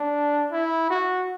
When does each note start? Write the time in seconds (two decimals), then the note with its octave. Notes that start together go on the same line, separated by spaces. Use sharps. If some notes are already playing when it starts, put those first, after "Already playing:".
Already playing: D4
0.52 E4
0.90 F#4